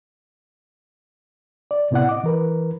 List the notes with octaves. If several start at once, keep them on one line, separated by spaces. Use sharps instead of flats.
D5
A2 C3 B3 E4 D5 F#5
D#5 D6
E3 A#4 B4